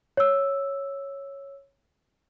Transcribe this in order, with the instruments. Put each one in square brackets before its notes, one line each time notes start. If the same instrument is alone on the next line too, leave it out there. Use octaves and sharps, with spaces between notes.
[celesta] C#5 E6